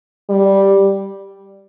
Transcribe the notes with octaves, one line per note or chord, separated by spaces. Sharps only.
G3